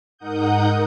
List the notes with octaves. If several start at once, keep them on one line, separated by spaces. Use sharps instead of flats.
G#2 D#4 A#4 F#5 D#6 G6